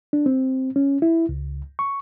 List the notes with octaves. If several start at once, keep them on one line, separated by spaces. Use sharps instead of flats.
D4
C4
C#4
E4
C#2
C#6